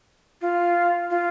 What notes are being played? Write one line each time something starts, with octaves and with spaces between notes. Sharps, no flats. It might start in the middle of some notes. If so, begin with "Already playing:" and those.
F4
F4